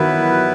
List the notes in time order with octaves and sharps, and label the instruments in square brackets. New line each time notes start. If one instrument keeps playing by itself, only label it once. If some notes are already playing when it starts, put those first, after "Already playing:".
Already playing: [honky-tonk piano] D#3 E3 F#3 [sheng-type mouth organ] B3 E4 B4